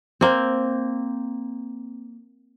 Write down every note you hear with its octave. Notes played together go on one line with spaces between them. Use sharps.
A#3 C4